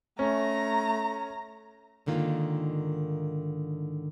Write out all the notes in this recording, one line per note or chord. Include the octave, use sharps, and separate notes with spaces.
A3 C#4 A#5
G#2 D3 D#3 A#3 F4